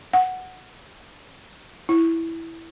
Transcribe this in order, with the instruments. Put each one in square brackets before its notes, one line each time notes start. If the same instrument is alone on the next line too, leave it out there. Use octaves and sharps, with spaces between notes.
[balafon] F#5
E4